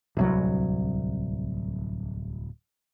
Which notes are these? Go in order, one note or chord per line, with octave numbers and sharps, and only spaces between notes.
D1 C2 F#3